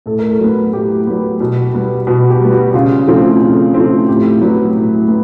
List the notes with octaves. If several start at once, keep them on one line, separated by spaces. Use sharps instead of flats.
A2 A4
A#4
A4
F#3 B3
A2 G4
F#3 B3
B2
G3 B3
B2 F#4
G4
G3 B3
F#4
C#3 F4
F3 A3 C4
C#3
F3 A3 C4
A2 G4
F#3 B3
A2
B3